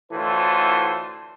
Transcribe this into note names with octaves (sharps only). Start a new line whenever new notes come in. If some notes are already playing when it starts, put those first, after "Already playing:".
D2 A2 E3 F4 A4 C5